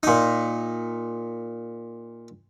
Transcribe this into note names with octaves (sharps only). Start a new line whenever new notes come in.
A#2 D#4